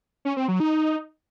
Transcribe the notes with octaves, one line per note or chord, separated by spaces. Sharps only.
C#4
C4
F#3
D#4